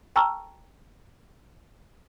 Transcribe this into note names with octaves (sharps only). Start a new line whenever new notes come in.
G5 A5 A#5 C#6 E6 F6